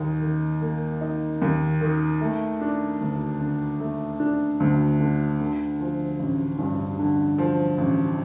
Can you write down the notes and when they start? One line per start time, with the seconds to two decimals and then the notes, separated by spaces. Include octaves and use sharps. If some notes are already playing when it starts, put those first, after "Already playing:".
Already playing: D#2 D#4
0.21 D#3
0.62 A#3
1.01 D#4
1.42 D#2
1.81 D#3
2.21 A3
2.61 D4
3.01 D2
3.41 D3
3.80 A3
4.20 D4
4.60 D2
5.00 D3
5.40 D3
5.80 F3
6.19 A1
6.58 G2
6.99 D3
7.38 F3
7.78 A1